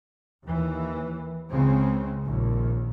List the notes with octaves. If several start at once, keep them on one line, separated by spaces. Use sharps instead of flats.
D#2 E3
C#2 C#3 G#3 C4
A#1 D#2